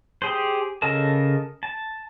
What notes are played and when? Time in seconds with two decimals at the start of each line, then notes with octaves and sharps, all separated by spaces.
0.22 G4 G#4 C5
0.82 C#3 A4 A#4 D#5 A5
1.63 A5